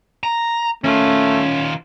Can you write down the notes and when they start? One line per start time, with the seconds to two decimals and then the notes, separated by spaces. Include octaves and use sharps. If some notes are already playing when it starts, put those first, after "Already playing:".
0.23 A#5
0.84 D#3 A3 C#4 F4